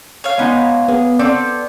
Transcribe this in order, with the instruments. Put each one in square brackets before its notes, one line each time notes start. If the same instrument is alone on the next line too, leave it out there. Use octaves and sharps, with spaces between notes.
[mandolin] C#5 F5
[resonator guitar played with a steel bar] G#3 B3 D#4
[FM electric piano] B3 [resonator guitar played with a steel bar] G#4
[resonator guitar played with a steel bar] B3 C4 A4 [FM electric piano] D5